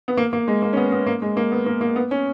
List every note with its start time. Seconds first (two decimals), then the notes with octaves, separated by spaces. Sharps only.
0.08 B3
0.17 A#3
0.33 A#3
0.48 G#3
0.62 A#3
0.73 C#4
0.77 B3
0.92 B3
1.07 A#3
1.22 G#3
1.37 A#3
1.52 B3
1.66 A#3
1.81 A#3
1.96 B3
2.11 C#4